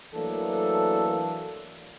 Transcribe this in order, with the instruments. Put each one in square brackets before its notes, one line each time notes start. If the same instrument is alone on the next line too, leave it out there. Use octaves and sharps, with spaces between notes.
[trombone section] E3 F#3 A3 A#3 D4 A4